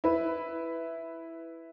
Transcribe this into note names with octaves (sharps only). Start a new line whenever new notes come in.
E4 B4